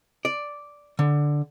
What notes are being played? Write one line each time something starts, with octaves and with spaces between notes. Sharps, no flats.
D5
D3